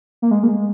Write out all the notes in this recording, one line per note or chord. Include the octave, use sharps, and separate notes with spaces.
A#3
G#3
A#3
G#3